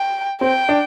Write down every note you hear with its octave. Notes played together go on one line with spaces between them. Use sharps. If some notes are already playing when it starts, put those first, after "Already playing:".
Already playing: G5
C4 G5
D4